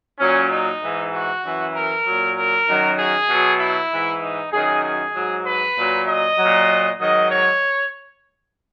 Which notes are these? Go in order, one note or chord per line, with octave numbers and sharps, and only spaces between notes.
A#2 F#3 C#4
D#4
G#2 E3
F#4
F#2 E3
A#4
A#2 F#3
A#4
F#2 D#3 F#3
G#4
B2 F#3
E4
G#2 E3
D#4
F#2 D#3 F#3 G#4
G#4
G#2 F#3
B4
A#2 F#3
D#5
A#2 F#3
G#2 D#3 F#3 D#5
C#5